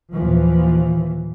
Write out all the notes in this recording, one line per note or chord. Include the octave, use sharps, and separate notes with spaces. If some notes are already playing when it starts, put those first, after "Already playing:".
D#2 A#2 E3 F3